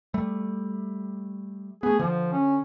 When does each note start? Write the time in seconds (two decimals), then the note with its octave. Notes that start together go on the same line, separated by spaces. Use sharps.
0.14 G3 A3
1.83 A3 B3 G#4
1.99 D3 F3
2.32 C#4